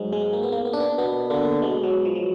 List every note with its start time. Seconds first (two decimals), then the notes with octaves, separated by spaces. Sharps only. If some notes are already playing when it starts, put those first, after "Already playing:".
Already playing: G#2 F#3 G#3
0.13 G#3
0.33 A#3
0.43 B3
0.52 A#3
0.65 B3
0.73 D4
0.80 B3
0.98 B2 B3
1.30 D3 A#3
1.62 B2 G#3
1.83 F#3
2.05 F3
2.15 F#3